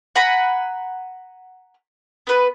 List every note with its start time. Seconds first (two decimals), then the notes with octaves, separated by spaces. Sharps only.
0.15 F#5 G#5 A#5 B5
2.27 B3 B4